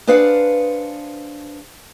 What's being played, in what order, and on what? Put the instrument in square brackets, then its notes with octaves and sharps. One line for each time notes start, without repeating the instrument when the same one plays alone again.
[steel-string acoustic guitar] D4 G#4 B4 C5 F5 F#5